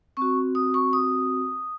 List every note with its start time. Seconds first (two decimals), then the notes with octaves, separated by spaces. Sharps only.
0.17 C4 F#4 C#6
0.55 D#6
0.74 C#6
0.93 D#6